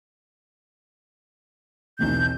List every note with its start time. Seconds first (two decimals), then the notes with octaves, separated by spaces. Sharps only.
1.99 B1 E2 C3 G6